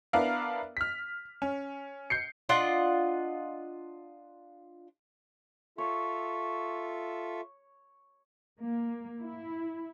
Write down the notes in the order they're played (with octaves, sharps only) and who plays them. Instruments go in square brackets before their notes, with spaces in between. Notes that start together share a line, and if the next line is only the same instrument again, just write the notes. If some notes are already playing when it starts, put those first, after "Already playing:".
[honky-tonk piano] B3 D4 E4 A#4 F5
F6 B6
C#4
G6 C7 C#7
[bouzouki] D4 F4 D#5 F#5
[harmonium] F4 A4 E5 [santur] C#5
[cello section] A#3
E4